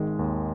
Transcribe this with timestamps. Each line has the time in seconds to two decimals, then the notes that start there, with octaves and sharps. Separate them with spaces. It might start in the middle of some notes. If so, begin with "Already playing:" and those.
Already playing: G#1 D#3 G#3
0.19 D#2